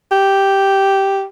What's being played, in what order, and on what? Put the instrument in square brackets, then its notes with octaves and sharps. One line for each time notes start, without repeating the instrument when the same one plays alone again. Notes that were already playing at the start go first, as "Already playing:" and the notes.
[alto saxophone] G4